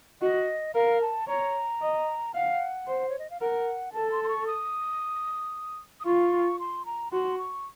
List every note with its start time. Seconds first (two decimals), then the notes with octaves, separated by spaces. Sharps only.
0.22 F#4 D#5
0.74 A#4 F5
1.01 A5
1.28 C#5 A#5
1.81 D#5
2.34 F5 F#5
2.87 C5
3.09 C#5
3.19 D#5
3.30 F5
3.41 A#4 F#5
3.93 A4 A5
4.12 C6
4.24 C6
4.29 C#6
4.47 D#6
6.00 D#6
6.06 F4 C#6
6.59 C6
6.86 A#5
7.12 F#4 C6
7.38 C#6